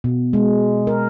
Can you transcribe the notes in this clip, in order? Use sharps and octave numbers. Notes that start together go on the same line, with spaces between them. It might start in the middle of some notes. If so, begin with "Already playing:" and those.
B2
G#3
A#4